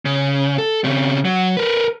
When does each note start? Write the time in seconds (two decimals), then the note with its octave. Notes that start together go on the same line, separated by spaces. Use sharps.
0.05 C#3
0.58 A4
0.84 C#3 C4
1.25 F#3
1.57 A#4 B4